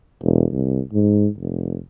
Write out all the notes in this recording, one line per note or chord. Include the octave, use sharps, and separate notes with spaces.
E1
C2
G#2
F1